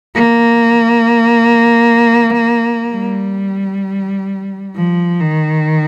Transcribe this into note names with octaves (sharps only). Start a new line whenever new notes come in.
A#3
G3
F3
D#3